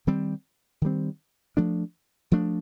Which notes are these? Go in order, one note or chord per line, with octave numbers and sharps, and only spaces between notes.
D#3 G3 C4
D#3 G3 C4
F3 A3 D4
F3 A3 D4